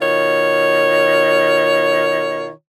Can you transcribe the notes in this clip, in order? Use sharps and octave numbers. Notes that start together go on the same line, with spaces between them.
B2 D#3 F4 C#5